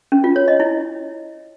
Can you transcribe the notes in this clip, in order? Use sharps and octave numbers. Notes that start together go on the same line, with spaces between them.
C#4
F4
C#5
D#5
E4